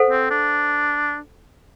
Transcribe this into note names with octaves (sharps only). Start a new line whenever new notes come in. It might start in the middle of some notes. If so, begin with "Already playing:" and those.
Already playing: A4 C5 F#5
C4
D4